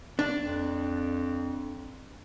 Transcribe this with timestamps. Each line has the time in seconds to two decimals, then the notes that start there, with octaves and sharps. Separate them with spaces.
0.19 D4
0.42 F2